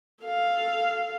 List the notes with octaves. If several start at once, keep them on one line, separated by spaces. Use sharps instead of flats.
A4 F5